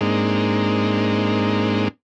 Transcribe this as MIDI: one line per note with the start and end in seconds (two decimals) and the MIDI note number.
0.01 1.88 44
0.01 1.88 56
0.01 1.88 58
0.01 1.88 60
0.01 1.88 62
0.01 1.88 63